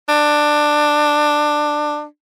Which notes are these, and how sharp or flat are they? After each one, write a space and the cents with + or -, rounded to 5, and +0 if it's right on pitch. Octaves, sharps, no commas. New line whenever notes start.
D4 +15